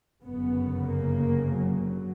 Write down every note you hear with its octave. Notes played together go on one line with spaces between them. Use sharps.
G1 F#2 C#3 B3
A#3
F#3